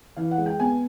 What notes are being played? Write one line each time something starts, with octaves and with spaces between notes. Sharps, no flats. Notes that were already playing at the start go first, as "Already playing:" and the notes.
E3 F5
F#5
G#3
G5
B3 G#5